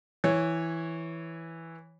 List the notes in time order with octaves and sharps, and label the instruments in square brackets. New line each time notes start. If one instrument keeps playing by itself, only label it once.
[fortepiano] E3 C#5